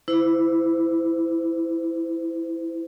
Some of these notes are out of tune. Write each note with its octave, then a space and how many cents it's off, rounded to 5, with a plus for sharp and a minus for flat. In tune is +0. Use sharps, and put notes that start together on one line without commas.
E4 +0 C5 -35